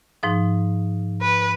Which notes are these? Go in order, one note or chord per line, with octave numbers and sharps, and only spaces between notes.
G#2 F3 D#4
B4